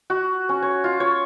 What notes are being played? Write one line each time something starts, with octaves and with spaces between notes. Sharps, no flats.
F#4
C#4
C#5
F4
C#5